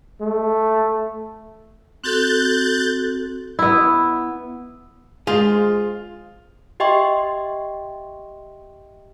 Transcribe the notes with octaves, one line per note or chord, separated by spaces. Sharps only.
A3
C4 F#4 A4 F#6 G6 A6
B3 E4
G#3 F4 G#4 C5
G4 D#5 E5 G5 C6 C#6